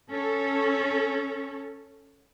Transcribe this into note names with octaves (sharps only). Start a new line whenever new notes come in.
C#4 A4